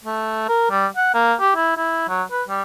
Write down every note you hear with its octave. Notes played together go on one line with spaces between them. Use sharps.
A3
A#4
G3
F#5
A#3
G4
E4
E4
F#3
B4
G3